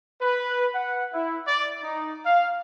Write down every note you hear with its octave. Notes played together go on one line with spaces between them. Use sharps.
B4
F#5
E4
D5
D#4
F5